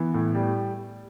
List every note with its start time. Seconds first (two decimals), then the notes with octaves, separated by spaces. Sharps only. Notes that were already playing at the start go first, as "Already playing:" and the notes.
Already playing: E3 B3
0.14 A2
0.35 G3